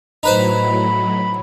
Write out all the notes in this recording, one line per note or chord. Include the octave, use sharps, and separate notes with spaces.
A2 F#3 D#4 B4 C5 B5